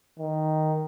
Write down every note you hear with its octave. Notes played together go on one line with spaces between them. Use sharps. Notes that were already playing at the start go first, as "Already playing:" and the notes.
D#3